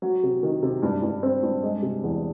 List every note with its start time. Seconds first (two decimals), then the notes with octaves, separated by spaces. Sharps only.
0.02 F#3
0.23 C3
0.43 D#3
0.62 C3
0.82 G2
1.03 G2
1.23 C4
1.43 G2
1.63 G#3
1.83 C3
2.03 E2